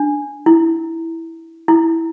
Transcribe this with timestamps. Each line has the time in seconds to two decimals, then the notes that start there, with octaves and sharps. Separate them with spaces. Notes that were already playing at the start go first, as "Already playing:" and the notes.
Already playing: D4
0.46 E4
1.68 E4